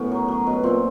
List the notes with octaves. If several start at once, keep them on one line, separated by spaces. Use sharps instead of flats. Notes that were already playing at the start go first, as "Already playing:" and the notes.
Already playing: F#2 A2 B3 C#4
F#3
F#3
B2
A#2 C4